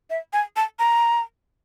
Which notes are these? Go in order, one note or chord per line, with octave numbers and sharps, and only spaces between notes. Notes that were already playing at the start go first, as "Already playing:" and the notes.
E5
G#5
A5
A#5